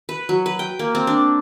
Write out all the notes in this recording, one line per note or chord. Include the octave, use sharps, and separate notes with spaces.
B4
F#3
B4
G5
A#3
C4
D4